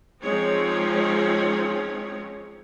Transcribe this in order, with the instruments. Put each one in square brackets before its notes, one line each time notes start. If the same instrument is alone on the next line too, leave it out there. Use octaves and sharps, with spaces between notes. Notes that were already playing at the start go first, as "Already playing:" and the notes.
[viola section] F3 G#3 C4 C#4 D#4 C#5